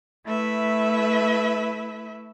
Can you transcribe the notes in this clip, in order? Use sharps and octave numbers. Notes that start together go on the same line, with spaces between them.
A3 E4 B4 E5